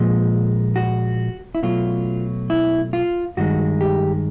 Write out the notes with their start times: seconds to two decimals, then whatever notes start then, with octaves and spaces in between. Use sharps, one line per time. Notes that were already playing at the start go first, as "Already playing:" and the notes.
Already playing: A#2 F3 G#3
0.76 F#4
1.55 E4
1.63 B2 F#3 A3 F4
2.50 E4
2.93 F4
3.37 G2 D#3 G#3 F#4
3.81 G4